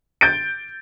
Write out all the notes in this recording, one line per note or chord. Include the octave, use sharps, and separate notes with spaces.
G6 A6 D7